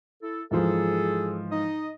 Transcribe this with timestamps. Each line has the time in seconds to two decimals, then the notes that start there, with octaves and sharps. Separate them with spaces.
0.22 E4 A4
0.51 G#2 E3 F3 G#4 A4
1.51 D#4 D#5